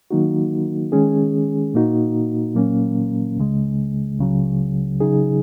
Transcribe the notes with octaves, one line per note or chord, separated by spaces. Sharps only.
D#3 F#3 A#3 D#4 F#4
D#3 G#3 C#4 G#4
A#2 A#3 D#4 F#4
A#2 F#3 A#3 C#4
C#2 C#3 G#3
C#2 C#3 F#3
C#3 F#3 D#4 G#4